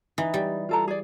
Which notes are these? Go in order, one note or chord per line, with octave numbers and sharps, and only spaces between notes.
E3 D#4
G3
F4 A4 A#5
G#4 D5